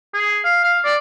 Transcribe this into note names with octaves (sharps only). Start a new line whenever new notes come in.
G#4
F5
F5
D5